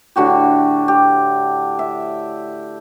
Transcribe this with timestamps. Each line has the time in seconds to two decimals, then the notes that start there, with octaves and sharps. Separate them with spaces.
0.16 A2 D3 F#4 G4
0.88 G4
1.79 E5